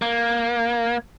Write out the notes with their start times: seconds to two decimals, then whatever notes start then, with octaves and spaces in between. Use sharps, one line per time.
0.02 A#3